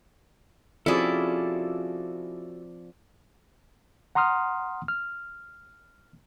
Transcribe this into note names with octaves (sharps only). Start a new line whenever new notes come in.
F3 C4 C#4 E4 F#4 G#4 A4 D5
F#5 A#5 C6 D#6 F6
F6